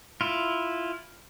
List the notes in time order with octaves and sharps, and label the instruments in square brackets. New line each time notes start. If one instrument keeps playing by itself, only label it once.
[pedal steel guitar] E4 F4